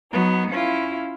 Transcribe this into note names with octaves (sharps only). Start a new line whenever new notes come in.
F#3 B3 D#4
C#4 E4 F4